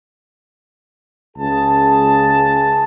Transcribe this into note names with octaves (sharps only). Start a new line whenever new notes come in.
C#2 G#4 A5